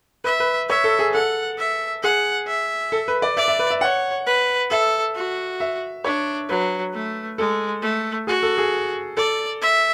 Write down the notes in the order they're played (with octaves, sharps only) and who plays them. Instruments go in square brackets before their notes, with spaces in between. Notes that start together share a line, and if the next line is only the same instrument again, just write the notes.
[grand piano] B4 [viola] E5
[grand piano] B4
[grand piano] C#5 [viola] E5
[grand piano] A4
G#4
[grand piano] A4 [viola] F#5
[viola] E5
[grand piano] G#4 [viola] F#5
[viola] E5
[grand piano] A4
B4
D5
[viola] D5 [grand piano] E5
[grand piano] E5
B4
E5
[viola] C#5 [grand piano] F#5
[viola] B4
[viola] A4 [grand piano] E5
[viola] F#4
[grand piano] E5
[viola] D4 [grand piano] C#5
[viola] F#3 [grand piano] B4
[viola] A3
[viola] G#3 [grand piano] A4
[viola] A3
[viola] F#4 [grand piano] G#4
[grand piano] A4
G#4
[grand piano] A4 [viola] D5
[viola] E5